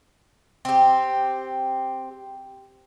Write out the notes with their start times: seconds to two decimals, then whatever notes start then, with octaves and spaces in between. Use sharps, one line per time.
0.65 C4 G4